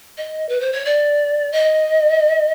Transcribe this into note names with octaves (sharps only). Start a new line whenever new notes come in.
D#5
B4
C5
C#5
D5
D#5